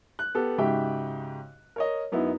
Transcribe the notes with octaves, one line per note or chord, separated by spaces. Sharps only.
F#6
B3 G4 A4
G#2 C#3 F#4 G4 E5 G5
A#4 C#5 D#5
F#2 B3 D#4 E4